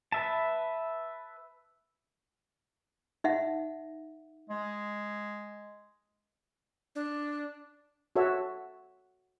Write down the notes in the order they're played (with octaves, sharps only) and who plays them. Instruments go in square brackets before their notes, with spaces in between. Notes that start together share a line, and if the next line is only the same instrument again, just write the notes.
[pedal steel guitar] B4 E5 A5
[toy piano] D#4 E5 F#5
[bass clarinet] G#3
[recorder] D4
[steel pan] F#4 A4 C#5 E5